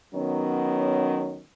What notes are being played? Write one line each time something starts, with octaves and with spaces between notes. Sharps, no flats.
D#3 F#3 B3 C#4